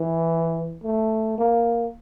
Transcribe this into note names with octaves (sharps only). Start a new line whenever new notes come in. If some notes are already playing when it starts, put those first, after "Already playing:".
Already playing: E3
A3
A#3